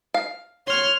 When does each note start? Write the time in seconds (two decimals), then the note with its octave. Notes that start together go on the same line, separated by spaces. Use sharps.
0.14 F5
0.67 C#5 C6 F6